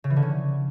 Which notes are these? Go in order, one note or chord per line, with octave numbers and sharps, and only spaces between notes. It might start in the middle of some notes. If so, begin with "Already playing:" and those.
C#3
E3
D3
C#4